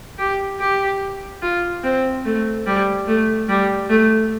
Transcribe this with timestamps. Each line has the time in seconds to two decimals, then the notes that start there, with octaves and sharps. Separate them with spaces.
0.19 G4
0.60 G4
1.42 F4
1.84 C4
2.25 A3
2.66 G3
3.07 A3
3.49 G3
3.90 A3